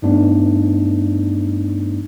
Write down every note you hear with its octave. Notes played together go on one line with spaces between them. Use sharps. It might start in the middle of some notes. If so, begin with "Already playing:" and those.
G2 G3 A3 B3 D4 D#4